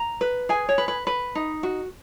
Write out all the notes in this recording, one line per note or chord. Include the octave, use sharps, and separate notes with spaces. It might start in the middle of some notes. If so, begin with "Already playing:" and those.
Already playing: A#5
B4
G#4 G#5
C#5
B4
B4
B4
D#4
F#4